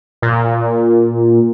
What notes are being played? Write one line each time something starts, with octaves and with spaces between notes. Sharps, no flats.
A#2